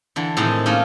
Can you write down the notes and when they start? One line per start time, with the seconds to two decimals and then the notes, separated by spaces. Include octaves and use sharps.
0.16 D3 E3
0.37 A2 C3 D#3 G#3 D#4
0.66 A3 A#3 C#4 D#4 F4